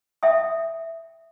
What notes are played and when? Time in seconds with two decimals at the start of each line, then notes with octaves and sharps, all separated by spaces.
0.23 E5 G5 D#6